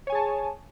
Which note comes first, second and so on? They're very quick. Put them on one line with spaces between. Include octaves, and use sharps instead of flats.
C#5 G#5 G#4 A5